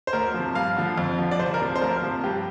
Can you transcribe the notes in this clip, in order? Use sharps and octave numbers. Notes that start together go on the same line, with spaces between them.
C5
D2 A#4
C3 F3
G2 F5
D3 F3
F2
D3 F3
D5
C2 C5
A#4
C3 F3
C5
D2 A#4
C3 F3
G2 G4